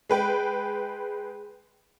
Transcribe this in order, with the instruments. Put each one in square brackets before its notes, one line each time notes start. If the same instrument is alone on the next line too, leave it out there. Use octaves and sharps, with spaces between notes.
[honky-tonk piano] G#3 B4 G5